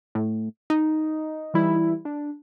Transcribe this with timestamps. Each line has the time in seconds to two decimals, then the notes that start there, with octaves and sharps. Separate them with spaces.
0.15 A2
0.70 D#4
1.54 E3 G3 E4
2.05 D4